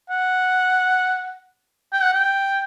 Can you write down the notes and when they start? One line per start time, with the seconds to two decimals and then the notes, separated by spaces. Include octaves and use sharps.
0.10 F#5
1.93 G5
2.03 F#5
2.13 G5